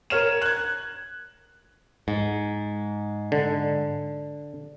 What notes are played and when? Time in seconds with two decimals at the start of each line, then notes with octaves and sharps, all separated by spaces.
0.10 A#4 C#5 F6 E7
0.42 F#6 G#6
2.08 G#2
3.32 D3